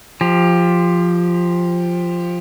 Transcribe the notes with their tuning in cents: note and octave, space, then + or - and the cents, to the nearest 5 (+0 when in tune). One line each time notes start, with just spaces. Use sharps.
F3 +0 G4 +20